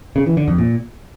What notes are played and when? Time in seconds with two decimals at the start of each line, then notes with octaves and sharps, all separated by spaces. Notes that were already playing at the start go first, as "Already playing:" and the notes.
0.16 C#3
0.26 E3
0.37 D3
0.48 F2
0.58 A#2